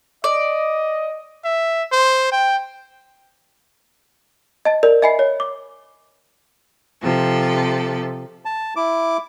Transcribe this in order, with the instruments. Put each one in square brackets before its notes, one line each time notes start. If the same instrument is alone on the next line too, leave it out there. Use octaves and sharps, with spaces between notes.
[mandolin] D5 [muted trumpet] D#5
[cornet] E5
C5
G5
[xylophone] D#5 A5 A6
A#4 D5
D#5 E5 G#5 B5 C7
C#5
D6
[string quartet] C3 F3 A4
[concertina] A5
E4 D6